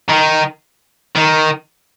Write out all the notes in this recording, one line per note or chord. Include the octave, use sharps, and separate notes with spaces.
D#3
D#3